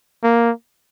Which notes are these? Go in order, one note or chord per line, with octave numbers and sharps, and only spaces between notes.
A#3